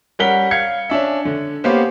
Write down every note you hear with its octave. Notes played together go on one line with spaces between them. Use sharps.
G3 C#4 A#4 F#5 B6 G7
F5 G#6 C#7
C#4 D4 E5
D3
A#3 B3 C#4 G4 C5